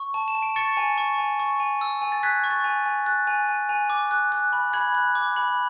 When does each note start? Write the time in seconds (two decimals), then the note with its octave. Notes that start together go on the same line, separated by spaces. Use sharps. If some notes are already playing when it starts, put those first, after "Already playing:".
Already playing: C#6
0.14 A5
0.28 E7
0.35 A5
0.42 D7
0.56 C#6 A6 C#7
0.77 G#5
0.98 C#6
1.18 G#5
1.39 C#6
1.60 G#5
1.81 E6
2.02 G#5
2.12 A6
2.23 F#6 G#6 B6
2.44 C#6
2.51 A6
2.64 G#5
2.86 G#5
3.06 F#6 A6
3.27 G#5
3.49 G#5
3.69 G#5
3.90 D6
4.11 F#6
4.32 F#6
4.53 B5
4.73 B5 G#6
4.95 F#6
5.15 D6
5.36 B5